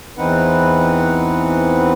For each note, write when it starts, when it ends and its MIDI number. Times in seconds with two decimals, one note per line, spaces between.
0.18 1.93 40
0.18 1.93 52
0.18 1.93 60
0.18 1.93 63
0.18 1.93 71
0.18 1.93 78